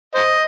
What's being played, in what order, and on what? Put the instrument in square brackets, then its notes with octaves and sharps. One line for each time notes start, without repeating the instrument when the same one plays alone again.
[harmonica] C5 D#5